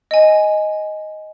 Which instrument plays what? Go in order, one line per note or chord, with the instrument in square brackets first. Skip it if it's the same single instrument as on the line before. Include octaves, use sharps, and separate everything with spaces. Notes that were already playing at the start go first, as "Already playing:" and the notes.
[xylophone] D#5 G#5